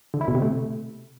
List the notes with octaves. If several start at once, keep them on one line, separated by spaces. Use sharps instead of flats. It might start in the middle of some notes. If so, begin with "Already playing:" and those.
D3
E4
B2
C3
A3